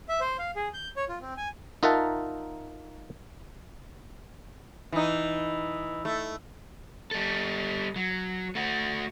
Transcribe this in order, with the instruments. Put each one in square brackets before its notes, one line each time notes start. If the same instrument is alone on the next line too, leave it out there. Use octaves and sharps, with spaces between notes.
[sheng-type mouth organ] E5
C5
F5
G#4
G6
C#5
F4
C4
G#5
[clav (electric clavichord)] D#4 F4 A#4 E5 F#5 A5
[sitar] E3 D#4
A3
[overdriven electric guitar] G3 A4
F#3
A3 F#4